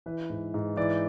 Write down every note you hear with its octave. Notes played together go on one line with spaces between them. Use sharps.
E3 B4
G#2
G#2
E3 D5